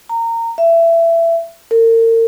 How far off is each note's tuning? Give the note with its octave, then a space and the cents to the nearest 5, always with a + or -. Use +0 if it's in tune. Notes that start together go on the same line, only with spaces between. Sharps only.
A#5 -25
E5 +20
A#4 -40